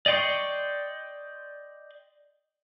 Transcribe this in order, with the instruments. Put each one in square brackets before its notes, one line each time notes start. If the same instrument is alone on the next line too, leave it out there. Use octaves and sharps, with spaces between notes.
[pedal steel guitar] D5 D#5 G5 C6 C#6